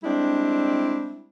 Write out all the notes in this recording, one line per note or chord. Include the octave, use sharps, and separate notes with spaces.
G3 G#3 C4 D4 E4